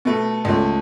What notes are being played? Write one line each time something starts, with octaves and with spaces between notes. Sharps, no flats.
B2 A3
C#2 A3